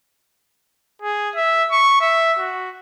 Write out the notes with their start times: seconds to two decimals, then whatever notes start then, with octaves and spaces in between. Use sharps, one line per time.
1.02 G#4
1.36 E5
1.71 C#6
2.01 E5
2.39 F#4